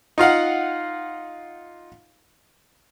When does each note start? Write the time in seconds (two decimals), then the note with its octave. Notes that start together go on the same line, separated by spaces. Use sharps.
0.18 D#4 F4 F5 F#5